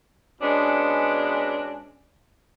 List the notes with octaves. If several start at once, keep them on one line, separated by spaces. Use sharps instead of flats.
B2 G#3 B3 C#4 D4